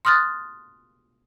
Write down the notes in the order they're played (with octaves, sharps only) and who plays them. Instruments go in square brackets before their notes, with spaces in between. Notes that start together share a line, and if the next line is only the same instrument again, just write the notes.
[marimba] C6 D#6 F6 F#6 A6